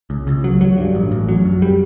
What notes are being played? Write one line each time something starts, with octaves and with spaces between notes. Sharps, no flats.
C#2
C#2
F#3
F#3
G2
A1
A1
F#3
F#2
G3